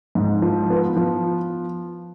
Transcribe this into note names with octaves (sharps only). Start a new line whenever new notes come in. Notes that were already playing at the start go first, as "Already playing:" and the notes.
G#2
F3
B3
F3